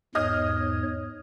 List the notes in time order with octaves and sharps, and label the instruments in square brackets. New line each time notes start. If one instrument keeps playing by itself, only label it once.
[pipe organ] E2 G#2 C#5 [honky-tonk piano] D#5 D#6 F6